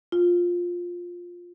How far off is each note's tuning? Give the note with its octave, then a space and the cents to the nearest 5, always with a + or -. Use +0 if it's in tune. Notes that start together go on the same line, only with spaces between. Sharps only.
F4 +10